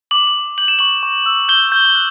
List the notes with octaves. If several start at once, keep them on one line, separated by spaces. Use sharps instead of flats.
D6 F#7
F#7
D6
G6 F#7
E7
C#6 F#7
C#6
E6
G6 G7
G6
F#6